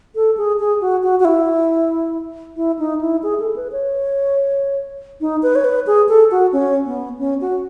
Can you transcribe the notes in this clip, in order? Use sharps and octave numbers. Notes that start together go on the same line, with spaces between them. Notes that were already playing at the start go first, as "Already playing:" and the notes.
A4
G#4
G#4
F#4
F#4
F#4
E4
E4
D#4
E4
G#4
A4
B4
C#5
D#4
B4
C#5
B4
G#4
A4
F#4
C#4
B3
C#4
F#4